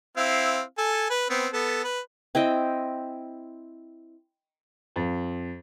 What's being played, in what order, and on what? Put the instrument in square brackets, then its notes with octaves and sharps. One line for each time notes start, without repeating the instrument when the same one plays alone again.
[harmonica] C4 E4 F5
A4 G#5
B4
B3 C4
B3 A4
B4
[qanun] C4 E4 D#5 G5
[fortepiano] F2